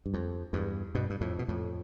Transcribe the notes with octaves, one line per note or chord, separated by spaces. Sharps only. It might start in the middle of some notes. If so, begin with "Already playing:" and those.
G2
F2
E2 G2
G2 B2
G2
F2 A2
B2
F2 A2